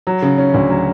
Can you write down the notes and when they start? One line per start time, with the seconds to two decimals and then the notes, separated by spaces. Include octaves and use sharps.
0.07 F#3
0.22 C#3
0.38 C#4
0.54 D2
0.70 F#3